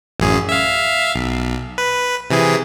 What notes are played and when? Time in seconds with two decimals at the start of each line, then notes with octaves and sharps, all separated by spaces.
0.20 A1 F#2 G#4
0.49 E5 F5
1.15 B1
1.78 B4
2.30 C3 E3 G#4